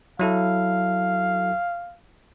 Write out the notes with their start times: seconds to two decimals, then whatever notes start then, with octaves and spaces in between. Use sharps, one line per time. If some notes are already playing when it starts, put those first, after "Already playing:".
0.19 F#3 E4 A4 F5